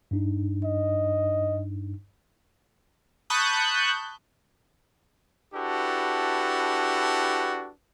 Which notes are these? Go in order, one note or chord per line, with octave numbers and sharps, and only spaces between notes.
G2 D4 D#4
D#5
A5 B5 C#6 D#6 F#6 G6
D4 E4 F#4 G4 A4 B4